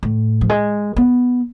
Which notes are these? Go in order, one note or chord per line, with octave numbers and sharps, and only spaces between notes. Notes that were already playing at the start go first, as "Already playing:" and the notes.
A2
F3
G#3
B3